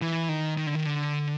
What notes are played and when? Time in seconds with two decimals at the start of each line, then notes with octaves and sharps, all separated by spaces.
0.02 E3
0.29 D#3
0.57 D#3
0.67 D3
0.75 D#3
0.86 D3